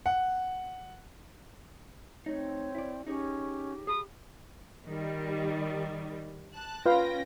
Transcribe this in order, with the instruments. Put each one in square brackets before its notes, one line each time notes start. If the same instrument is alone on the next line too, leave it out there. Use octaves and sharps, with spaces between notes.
[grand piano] F#5
[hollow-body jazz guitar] A3 D#4 [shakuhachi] C4 [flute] C#5
[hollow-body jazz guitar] E4 D5
[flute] C#4 [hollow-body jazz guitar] D#4 G#4 C#5 [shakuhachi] G4
[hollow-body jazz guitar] G#4 A5 B5 [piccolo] D#6
[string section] D#3 G3
A5 F#6
[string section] C#4 G5 A#6 [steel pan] F4 B4 F5